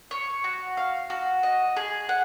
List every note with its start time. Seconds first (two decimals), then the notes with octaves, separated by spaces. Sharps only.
0.11 C#5
0.44 F#4
0.77 F5
1.10 F#4
1.43 D#5
1.77 G#4
2.09 F#5